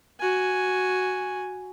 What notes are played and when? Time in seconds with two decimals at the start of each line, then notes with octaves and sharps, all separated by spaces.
0.20 F#4 G#5